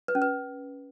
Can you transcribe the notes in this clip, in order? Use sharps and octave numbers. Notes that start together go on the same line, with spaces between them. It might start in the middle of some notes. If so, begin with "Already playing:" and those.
B4
C#4
B4